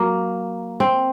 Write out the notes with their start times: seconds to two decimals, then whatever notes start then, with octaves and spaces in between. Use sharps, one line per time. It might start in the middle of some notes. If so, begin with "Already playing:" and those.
Already playing: F#3 A#3
0.80 C4